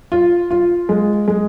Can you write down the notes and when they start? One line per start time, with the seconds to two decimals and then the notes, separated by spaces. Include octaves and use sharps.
0.12 F4
0.51 F4
0.89 G#3
1.28 G#3